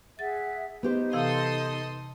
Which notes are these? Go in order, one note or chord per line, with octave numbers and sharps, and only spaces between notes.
G#4 E5 F#5 A6
B3 D#4 G4 C5
C3 E3 A4 F5 C6 D#6